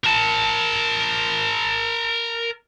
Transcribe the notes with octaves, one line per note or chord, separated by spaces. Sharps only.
A#4 A5